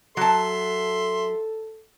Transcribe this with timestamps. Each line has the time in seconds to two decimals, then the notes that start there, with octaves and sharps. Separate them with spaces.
0.17 F#3 A4 E5 A5 C6